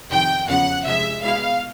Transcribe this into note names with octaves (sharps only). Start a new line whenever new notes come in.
F2 C3 D#3 G5
E2 C#3 F3 F#5
C3 F3 G#3 E5
B2 G#3 B3 E4 F5